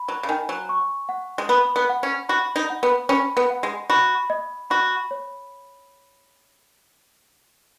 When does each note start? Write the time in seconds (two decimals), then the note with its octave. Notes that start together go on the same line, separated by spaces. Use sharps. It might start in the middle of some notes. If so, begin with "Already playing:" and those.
Already playing: B5
0.08 F#3
0.23 C#3
0.29 D#3 G#5
0.49 F#3
0.69 C#6
1.09 F#5
1.38 G#3
1.49 B3 B5
1.76 B3
1.89 F#5
2.03 C#4
2.29 F#4 B5
2.56 D#4
2.70 F#5
2.83 B3
3.09 C#4 B5
3.37 B3
3.50 F#5
3.63 G#3
3.90 F#4 B5
4.30 D#5
4.70 F#4 B5
5.11 C#5